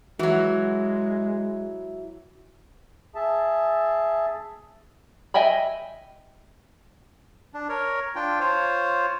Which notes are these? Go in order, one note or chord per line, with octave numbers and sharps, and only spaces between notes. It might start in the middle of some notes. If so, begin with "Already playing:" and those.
E3 F#3 G#3 E4 F#4 E5
G#4 E5 A5
D#5 E5 G5 G#5 B5
D4
A#4 C#5
D4 F4 G5
F4 C5 C#5